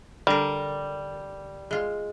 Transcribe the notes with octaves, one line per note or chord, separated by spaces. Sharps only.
D3 G3 A#4
G#3 F4